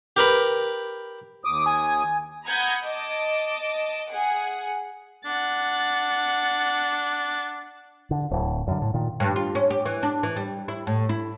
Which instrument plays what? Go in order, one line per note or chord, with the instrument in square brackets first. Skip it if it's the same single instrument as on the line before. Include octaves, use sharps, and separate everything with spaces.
[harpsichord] G4 A#4 B4
[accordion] D#2 D#6 [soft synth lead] D6
[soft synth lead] G#5
[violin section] F#5 A#5 B5 D#6 G6 G#6
D#5 A5 D6
G#4 F#5
[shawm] D4 [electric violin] F#5 A6
[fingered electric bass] D3
D1
F#2 D3
A2
A#2 D#3
[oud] G2
F4
C#4
G4
E3
D4
E3
G3
E4
A2
E4